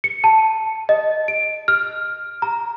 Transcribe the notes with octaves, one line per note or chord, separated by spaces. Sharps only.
C#7
A5
D#5
D7
F6
A#5